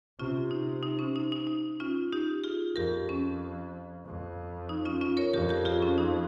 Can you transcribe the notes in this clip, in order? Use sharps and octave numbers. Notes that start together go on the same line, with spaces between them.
C3 C#4 F4
D#4
D#4
C#4
D#4
D#4
D#4
C#4 F4
D#4 G4
F4 G#4
F2 G4 A#4
C#4
F2
D#4
C#4 F4
C#4 F4
A#4 C#5
F2 G4 A#4
G4 A#4
F4 G#4
C#4
D#4